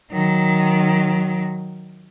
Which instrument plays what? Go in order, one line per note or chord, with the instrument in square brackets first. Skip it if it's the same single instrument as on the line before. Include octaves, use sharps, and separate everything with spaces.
[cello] D#3 F#3